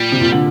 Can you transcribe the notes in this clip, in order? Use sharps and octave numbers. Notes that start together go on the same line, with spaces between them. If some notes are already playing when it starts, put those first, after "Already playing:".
Already playing: A#2 G3
C3
A#2
D3